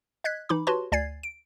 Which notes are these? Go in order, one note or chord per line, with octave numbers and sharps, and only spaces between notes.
D#5 F#6 G#6 B6
E3 D#4 B5 D6
F#4 G4 B4 C#5 A5 C6
D2 D5 G#5 G#6 A6 C7
D7